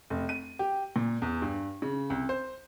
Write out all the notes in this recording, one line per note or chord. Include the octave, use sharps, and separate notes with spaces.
F1
D#7
G4
A#2
E2
G2
C#3
C2
C5